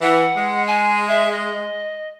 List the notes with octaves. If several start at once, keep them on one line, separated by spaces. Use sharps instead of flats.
E3 F#5
G#3
G#5
E5
D#5